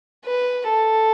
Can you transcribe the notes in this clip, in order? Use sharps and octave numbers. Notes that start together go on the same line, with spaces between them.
B4
A4